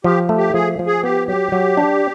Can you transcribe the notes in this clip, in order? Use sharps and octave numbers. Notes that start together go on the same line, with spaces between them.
F3 G4
A3
G4
F3 G#4
F3
G#4
B3 G4
F#3 G4
F#3
D4